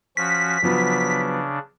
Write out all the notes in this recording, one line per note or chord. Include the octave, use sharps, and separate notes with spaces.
F3 C#4 F#4 B6
C#3 F3 F#3 B3 D4